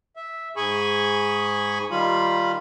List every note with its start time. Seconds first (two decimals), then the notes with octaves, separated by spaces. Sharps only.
0.16 E5
0.56 G#2 G#4 G#5 B5 C#6
1.91 D#3 G3 F4 B5